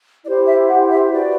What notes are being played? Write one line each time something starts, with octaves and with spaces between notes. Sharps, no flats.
E4 G4 C5 D5
E5
F#5
E5
F#4 B4 D5